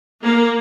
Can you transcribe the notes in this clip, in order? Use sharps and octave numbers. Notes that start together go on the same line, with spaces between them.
A#3